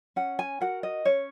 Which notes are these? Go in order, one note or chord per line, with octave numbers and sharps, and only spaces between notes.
C#4 F#5
G#5
F#4 A#4 F#5
D#5
C#4 C#5